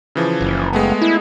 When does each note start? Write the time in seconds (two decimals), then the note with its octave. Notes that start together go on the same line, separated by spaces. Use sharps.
0.15 C#3 E3 F3
0.41 F#1
0.73 G#3 A3 B3
1.02 E4